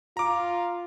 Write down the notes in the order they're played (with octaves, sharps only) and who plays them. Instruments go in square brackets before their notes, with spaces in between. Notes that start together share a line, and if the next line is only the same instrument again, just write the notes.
[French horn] F4 [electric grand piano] A#5 D6